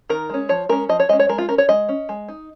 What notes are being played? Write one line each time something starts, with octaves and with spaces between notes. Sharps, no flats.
D#3 A#4
G#3 C#4
F3 C#5
G#3 C#4 A#4
F3 D#5
C#5
G#3 C#4 D#5
C#5
G#3 A#4
F4
C#4 A#4
C#5
G#3 D#5
C#4
G#3
D#4